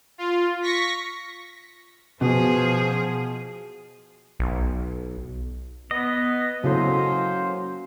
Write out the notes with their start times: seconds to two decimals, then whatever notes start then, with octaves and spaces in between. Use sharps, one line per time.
0.18 F4
0.62 C#6 A#6 B6
2.21 B2 F3 G#4
4.39 B1
5.91 B3 D#5
6.64 C#3 F#3 A#3 C#4 E4 A4 C5